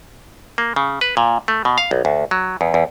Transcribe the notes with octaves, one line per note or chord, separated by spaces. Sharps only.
A#3
C#3
B4
A#2
A3
B2
F5
B1
D2
F#3
E2
E2